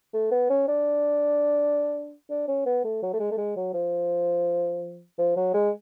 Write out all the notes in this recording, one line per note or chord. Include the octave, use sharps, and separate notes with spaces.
A3
B3
C#4
D4
D4
C#4
B3
A3
F#3
A3
G#3
A3
G#3
F#3
F3
F3
F#3
G#3